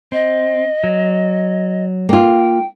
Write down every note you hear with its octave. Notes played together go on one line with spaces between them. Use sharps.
C4 D#5
F#3
A#3 F4 G5